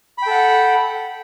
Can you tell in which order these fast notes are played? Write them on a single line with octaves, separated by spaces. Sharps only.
B5 G5 A4 F#5